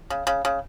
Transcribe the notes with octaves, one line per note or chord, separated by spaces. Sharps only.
C#3
C#3
C#3